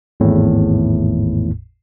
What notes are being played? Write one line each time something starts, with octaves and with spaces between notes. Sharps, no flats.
G#1 E2 A2